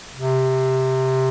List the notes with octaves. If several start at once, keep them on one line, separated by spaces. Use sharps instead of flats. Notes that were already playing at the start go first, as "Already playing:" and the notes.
C3